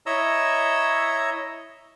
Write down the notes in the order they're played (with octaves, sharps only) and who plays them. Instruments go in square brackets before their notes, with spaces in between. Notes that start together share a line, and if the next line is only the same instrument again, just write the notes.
[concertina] E4 C#5 D#5 A#5 E6